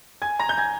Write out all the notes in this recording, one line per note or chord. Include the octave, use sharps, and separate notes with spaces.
G#5 G#6
A#5 A#6
G6
G#5 G#6